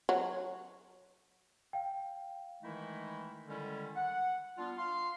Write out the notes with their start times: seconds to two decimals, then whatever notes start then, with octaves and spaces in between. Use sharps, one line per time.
0.09 F#3 C#5
1.73 F5 G5
2.63 D#3 E3 G#3 A3 D#4 E4
3.47 D3 D#3 G3 G#3 C#4 E4
3.96 F#5
4.58 G3 B3 D4 F4
4.78 F5 C6